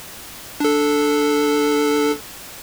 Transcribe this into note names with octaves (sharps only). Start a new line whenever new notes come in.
D4 A4